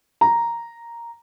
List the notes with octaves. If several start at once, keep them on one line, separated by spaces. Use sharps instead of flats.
A#5